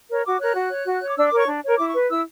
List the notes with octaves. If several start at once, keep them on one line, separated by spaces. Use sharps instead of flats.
A#4 C#5
F#4 D6
A#4 C#5 F#6
F#4
C#5
F#4
C#5
D6
D4 E6
D6
A#4 C#5 C#6
D4
A#4 C#5
E4 D6
C#6
B4
E4 E6